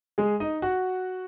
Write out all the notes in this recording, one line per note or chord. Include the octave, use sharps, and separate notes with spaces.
G#3 G#4
D#4 D#5
F#4 F#5